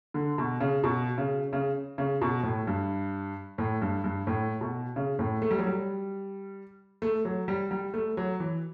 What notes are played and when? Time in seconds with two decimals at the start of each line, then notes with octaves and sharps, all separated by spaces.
0.14 D3
0.38 B2
0.60 C#3
0.84 B2
1.18 C#3
1.53 C#3
1.98 C#3
2.22 B2
2.43 A2
2.67 G2
3.58 A2
3.82 G2
4.04 G2
4.27 A2
4.61 B2
4.96 C#3
5.19 A2
5.42 A3
5.51 G3
5.59 F#3
5.67 G3
7.02 A3
7.25 F#3
7.48 G3
7.71 G3
7.94 A3
8.17 F#3
8.40 E3